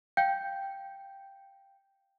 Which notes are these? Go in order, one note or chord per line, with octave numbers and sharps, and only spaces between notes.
F5 G5 G6